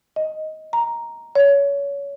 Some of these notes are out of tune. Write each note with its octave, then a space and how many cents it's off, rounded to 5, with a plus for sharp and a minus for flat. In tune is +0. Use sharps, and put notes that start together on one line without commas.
D#5 +10
A#5 +5
C#5 +25